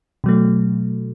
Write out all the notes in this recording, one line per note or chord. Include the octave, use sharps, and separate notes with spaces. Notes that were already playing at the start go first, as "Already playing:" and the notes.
B2 F#3 A3